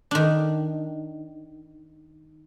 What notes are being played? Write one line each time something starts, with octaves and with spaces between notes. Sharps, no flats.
D#3 D4